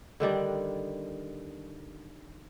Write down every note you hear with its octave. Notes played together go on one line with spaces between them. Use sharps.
D3 D#3 G3 D4